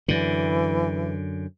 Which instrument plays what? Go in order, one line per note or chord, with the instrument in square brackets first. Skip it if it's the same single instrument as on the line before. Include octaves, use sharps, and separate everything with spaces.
[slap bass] F#2 D3 [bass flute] E3